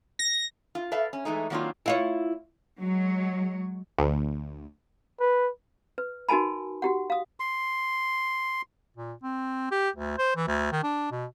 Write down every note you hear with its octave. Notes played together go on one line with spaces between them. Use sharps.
A#6
F4
A4 B4 D5 E5 F5
C#4
E3 G#3 A3 D#4
D#3 F#3 A#3 C4 D4 F4
E4 F4 C#5
F#3 G#3 C#5
D2
B4
B4
D#4 F#4 A#4 G#5 A5 B5
F#4 G4 F#5
F5 D#6
C6
A#2
C4
G4
D2
C5
E3
D2
D#3
D4
B2